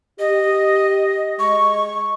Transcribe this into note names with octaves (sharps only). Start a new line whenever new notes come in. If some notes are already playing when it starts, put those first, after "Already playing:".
G4 D#5
G#3 D#5 C#6